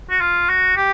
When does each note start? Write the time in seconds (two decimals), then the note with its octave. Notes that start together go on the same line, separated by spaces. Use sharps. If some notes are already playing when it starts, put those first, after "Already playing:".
0.10 F#4
0.21 F4
0.49 F#4
0.76 G4